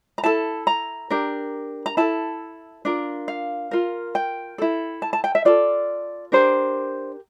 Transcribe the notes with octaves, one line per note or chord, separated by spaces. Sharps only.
A#5
E4 A4 A5
A#5
D4 G4 A#4
A#5
E4 A4 A5
D4 F4 A#4
F5
F4 A#4
G5
E4 A4
A5
A5
G5
E5
F4 A4 D5
D4 G4 A#4 C5